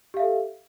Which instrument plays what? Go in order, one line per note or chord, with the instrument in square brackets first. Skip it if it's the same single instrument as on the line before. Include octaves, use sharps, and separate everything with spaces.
[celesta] G4
F5
E5
A4